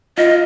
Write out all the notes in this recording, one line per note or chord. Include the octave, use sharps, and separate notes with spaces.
F4 D#5